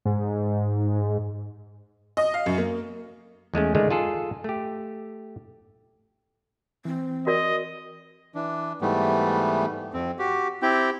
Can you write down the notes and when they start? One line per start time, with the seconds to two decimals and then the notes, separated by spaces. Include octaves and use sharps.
0.05 G#2
2.17 D#5
2.34 F5
2.46 F#2
2.58 A#3
3.54 E2 G#3 A3 C#4
3.75 D3 D#3 G#3 A3
3.90 F4 G#4 A4
4.44 A3 G4
6.85 E3 C4
7.27 F#4 A#4 D5 D#5
8.35 E3 D4
8.81 G#2 E3 G3 A3 B3
9.94 F2 C4
10.19 F#4 G4
10.62 C4 E4 G4 G5